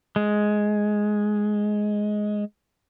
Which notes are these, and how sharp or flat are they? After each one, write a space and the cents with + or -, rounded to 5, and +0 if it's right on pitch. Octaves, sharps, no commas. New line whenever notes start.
G#3 +10